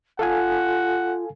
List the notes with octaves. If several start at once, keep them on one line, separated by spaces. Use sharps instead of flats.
F4 A4 F5 F#5 G#5